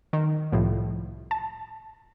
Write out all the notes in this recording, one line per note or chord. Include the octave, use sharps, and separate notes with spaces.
D#3
C2 A2 F3
A5